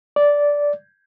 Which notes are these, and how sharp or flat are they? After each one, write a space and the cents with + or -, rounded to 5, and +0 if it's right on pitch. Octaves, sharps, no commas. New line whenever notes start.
D5 -10